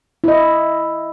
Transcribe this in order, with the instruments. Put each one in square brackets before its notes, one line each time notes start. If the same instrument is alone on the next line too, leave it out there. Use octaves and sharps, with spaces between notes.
[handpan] E4 D#5